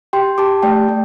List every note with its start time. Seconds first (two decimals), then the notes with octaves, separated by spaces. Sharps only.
0.13 G4 G5 C6
0.38 G4 A5 D6
0.63 A3 D5 G5
0.89 A3